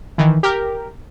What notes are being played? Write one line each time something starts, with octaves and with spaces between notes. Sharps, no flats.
D#3 E3
G4 A#4